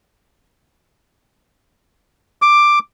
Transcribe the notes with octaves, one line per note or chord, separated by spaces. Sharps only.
D6